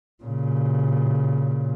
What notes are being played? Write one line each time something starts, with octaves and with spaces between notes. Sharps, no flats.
A#2 C#3